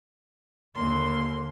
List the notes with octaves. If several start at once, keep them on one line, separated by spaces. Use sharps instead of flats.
D#2 D3 A#3 C6